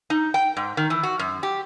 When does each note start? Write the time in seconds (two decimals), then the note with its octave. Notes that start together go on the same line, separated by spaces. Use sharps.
0.10 D#4
0.34 G5
0.57 G#2
0.77 D#3
0.90 E3
1.03 F#4
1.19 F#2
1.43 G4